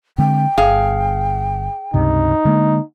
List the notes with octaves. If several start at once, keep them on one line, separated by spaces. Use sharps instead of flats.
D3 G#3 C4 G5
G1 G#4 F5
C#2 G2 C3 D#4
D3 G#3 A#3